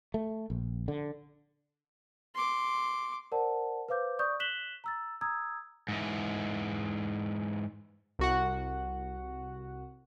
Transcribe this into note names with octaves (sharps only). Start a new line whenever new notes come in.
A3
A#1
D3
C6 D6
A#4 C5 D5 F#5 A5
B4 C5 F5 D6 G6
D5 C#6 D#6 G6
F#6 B6 E7 F#7 G7
A#5 E6 A6
A#5 D#6 E6 G#6
G#2 E3
C2 F#4 F#5